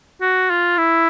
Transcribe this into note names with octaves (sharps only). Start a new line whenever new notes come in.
F#4
F4
E4